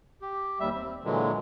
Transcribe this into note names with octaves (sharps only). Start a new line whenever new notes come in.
G4
D#2 G3 E5
C4
A#2 D3 E3 F#3 G#3